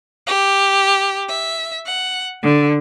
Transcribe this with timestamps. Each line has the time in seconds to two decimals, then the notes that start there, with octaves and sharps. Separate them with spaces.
0.26 G4
1.29 E5
1.86 F#5
2.43 D3